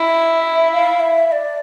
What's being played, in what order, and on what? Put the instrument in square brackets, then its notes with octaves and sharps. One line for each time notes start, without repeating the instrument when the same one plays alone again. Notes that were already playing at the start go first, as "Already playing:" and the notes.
Already playing: [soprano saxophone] E4 [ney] E5
[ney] F5
E5
E5
D5